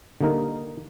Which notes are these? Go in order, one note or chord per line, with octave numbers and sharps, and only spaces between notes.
D3 G3 A#3 D#4 A#4